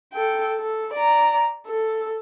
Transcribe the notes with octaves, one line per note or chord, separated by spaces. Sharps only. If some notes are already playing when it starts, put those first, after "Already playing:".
A4 G5
A4
D5 A#5
A4